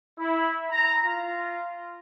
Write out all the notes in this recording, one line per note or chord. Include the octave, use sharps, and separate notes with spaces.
E4
A#5
F4